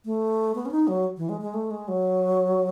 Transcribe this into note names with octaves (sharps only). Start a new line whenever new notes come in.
A3
B3
C#4
D#4
F#3
E3
G#3
G#3
A3
G#3
F#3